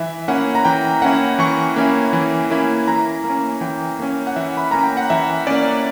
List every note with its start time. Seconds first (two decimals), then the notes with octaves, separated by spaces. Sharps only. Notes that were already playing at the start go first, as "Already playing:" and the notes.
Already playing: E3 E5
0.28 A#3 C#4 E4 F#5
0.55 A#5
0.65 E3 G5
1.02 A#3 C#4 E4 F#5
1.39 E3 C#6
1.76 A#3 C#4 E4
2.13 E3
2.50 A#3 C#4 E4
2.87 E3 A#5
3.24 A#3
3.29 C#4
3.61 E3 G5
3.99 A#3 C#4
4.27 F#5
4.36 E3 E5
4.57 B5
4.71 A#3 C#4 A#5
4.83 G5
4.97 F#5
5.10 E3 E5
5.47 A#3 C#4 D5